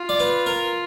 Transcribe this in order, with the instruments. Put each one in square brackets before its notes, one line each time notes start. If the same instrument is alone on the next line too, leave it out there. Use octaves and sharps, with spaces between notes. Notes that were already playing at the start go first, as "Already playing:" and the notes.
Already playing: [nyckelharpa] F4
[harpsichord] D5
B4
A#4